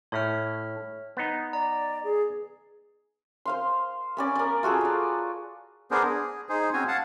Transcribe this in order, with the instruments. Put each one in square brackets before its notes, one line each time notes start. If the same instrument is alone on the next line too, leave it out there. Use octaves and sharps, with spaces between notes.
[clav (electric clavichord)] A2 [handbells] C#5 E5 F6
[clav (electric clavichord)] B3 D#4
[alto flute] D5 [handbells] A#5
[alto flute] G#4
[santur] C5 F5 C6
B3 C#4 D5
A#4 D5
F4 F#4 G#4 A4
D5 A#5
[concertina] B3 D4 G#4 A#4 C5
G#4
D#4 G#4 C5
C4 C#4 F#4 C5 C#5 G#5
F5 F#5 A5